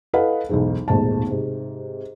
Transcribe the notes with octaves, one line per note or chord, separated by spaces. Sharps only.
E4 A4 B4 D#5 F5 F#5
B1 E2 G#2
D#1 G#1 G#2 B2 A3 A5
G#2 C3